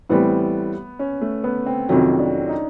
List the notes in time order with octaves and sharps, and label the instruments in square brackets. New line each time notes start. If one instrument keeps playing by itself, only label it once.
[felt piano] A2 E3 G3 C4 [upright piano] B3
[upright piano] C#4
A3
B3
C4
[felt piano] F2 C3 D#3 F#3 [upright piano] C#4
[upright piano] D4
D#4